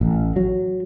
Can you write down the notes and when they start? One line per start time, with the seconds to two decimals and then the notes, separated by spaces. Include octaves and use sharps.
0.01 A1
0.36 F#3